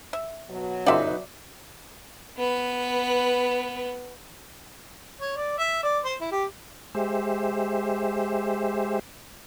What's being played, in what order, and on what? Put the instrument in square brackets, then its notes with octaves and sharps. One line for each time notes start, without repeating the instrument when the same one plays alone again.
[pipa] E5
[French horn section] B2 F#3
[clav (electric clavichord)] G1 F#2 F4 [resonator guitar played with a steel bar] D#4 B4 [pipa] D5 E5
[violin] B3 B4
[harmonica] C#5
D5
E5
D5
C5
E4
G4
[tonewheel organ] G#3 G4 C5 E5